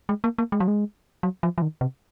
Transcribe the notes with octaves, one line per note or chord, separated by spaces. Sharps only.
G#3
A#3
A#3
G#3
F#3
G#3
F#3
F3
F3
D#3
C3